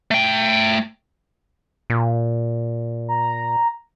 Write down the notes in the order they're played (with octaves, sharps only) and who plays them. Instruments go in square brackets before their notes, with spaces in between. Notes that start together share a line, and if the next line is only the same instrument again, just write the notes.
[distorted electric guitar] A3 G5
[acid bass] A#2
[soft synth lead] A#5